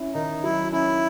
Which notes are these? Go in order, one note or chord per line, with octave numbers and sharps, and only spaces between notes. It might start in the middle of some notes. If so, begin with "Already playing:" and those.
Already playing: C#4 E4
D#3 D#4
F#3 E4
C#4 E4